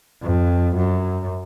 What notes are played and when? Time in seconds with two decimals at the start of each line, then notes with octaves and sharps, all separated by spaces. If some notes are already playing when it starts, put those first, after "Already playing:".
0.22 F2
0.76 F#2